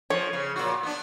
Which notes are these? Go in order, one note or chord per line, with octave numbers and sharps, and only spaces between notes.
F3 C#5
C#3
A#2 F#4
B3 D4